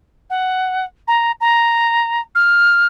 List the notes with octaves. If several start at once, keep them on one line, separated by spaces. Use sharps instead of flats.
F#5
A#5
A#5
F6